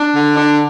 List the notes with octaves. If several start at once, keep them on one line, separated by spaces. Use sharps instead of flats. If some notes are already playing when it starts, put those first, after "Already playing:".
Already playing: D4
D3
D4